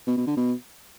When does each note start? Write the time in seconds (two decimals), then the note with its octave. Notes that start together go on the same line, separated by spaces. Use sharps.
0.07 B2
0.17 B2
0.27 D3
0.37 B2